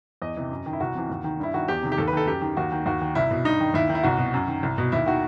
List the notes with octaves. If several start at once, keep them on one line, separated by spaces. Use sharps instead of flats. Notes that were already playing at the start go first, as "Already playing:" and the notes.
E2 D#5
C3 E3
F#2
D#3
E4
C2 F#4
C3 E3
D#2
D#3
G2 E4
D#3 F#4
E2 G4
C3 D#3
G4
D#2 A4
B4
D#3 A4
F#2 G4
D#3
D#2 F#4
D#3
D#2 F#4
D#3
C2 E4
B2
G2 D#4
D#3
D#2 E4
D#3
E4
C2 F#4
B2
F#2
D#3
C2
B2
D#2 E4
D#3 F#4